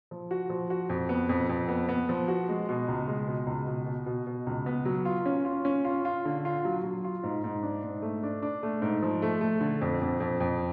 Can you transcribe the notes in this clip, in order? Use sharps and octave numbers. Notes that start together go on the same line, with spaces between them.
F3
F#4
F3
F#4
F2
B3
F2
F2
B3
B3
F3
F#4
G#3
B2
C#2
G#3
B2
C#2
B2
B2
B2
B2
C#2
B3
F#3
F4
C#4
F4
C#4
F4
F4
D3
F4
F#3
F#3
F4
G#2
G#2
D4
G#2
A3
D4
D4
A3
G#2
F3
A3
A3
D3
F2
F2
F2
F2